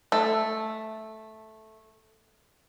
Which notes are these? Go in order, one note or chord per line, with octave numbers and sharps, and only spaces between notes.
A3 A4